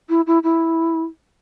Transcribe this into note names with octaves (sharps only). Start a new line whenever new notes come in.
E4
E4
E4